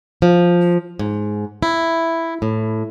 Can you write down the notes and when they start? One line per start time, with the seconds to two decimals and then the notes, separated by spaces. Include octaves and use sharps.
0.22 F3
0.99 G#2
1.63 E4
2.42 A2